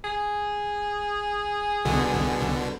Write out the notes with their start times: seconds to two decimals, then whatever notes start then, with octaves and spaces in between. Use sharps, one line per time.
0.04 G#4
1.85 C2 B2 D3